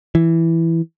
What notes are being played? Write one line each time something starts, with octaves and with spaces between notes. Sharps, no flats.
E3